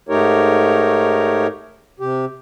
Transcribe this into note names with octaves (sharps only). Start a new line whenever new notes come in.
G#2 A3 D#4 G4 A#4 C#5
C3 G4